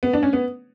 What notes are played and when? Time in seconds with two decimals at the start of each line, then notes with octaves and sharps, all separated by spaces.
0.03 B3
0.13 D4
0.23 C#4
0.33 B3